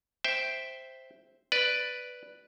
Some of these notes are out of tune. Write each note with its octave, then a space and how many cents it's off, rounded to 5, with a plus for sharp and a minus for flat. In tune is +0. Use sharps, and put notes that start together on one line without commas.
C5 +0 E5 +0 G5 +0
B4 +0 D5 +0